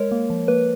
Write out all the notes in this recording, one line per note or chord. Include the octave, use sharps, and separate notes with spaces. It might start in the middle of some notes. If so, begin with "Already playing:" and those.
Already playing: G#3 A#4 C#5
A#3
F3
A#3 B4